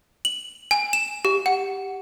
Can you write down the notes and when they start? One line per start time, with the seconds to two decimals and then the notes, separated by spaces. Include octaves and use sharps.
0.25 F#7
0.71 G#5
0.93 E7
1.25 G4
1.46 F#5